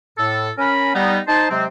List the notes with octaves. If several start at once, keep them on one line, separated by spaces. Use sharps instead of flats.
A2 A4
C#4 A#4 B5
G3 B3 D#4
D#4 C5 A5
C3 F#3 G#3 C4